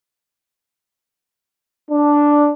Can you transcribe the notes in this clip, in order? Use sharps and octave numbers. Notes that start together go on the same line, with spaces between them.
D4